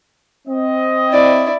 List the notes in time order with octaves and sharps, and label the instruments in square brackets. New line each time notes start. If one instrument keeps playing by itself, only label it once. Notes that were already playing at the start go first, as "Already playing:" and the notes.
[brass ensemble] C4 D#5
[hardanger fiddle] E4 D5